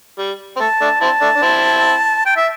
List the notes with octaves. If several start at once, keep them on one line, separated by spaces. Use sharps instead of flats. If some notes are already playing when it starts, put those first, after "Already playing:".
G3
C4
A3 A5
A3 D4
C4 E4 A5
A3 D4
D4
C4 E4
G5
E5